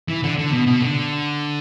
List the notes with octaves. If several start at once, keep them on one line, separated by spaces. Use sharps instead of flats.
E3
D3
D3
B2
B2
D3